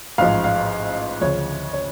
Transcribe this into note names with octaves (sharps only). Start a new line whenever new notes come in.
A1 G#2 F3 F5
F5
D2 C#3 F3 C#5
C#5